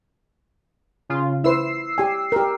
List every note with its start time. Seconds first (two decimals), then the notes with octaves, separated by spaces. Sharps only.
1.09 C#3 F4
1.44 E4 B4 C5 E6 C7
1.98 G4 G#5
2.32 G4 A#4